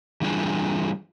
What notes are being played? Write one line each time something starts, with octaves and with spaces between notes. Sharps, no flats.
E3 G3 D4 F4 G#4